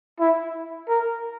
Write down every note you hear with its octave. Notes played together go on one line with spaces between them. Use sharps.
E4
A#4